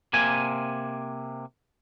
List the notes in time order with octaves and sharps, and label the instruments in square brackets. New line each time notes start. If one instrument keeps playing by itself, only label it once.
[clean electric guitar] C3 A#3 G#5